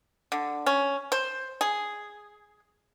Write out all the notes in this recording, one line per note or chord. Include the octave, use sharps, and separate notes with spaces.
D3
C#4
C5
G#4